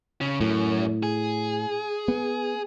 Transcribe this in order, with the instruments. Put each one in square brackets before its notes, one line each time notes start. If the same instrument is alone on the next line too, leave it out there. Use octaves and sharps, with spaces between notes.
[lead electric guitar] C#3
[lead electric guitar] F#2 [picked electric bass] A2
[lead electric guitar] G#4
[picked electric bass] B3